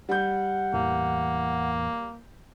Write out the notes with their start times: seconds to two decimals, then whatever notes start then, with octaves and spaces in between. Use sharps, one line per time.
0.09 G3 F#5 G6
0.73 E2 A2 E3 A#3